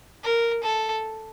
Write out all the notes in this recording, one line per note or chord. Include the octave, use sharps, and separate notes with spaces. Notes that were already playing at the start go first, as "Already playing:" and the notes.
A#4
A4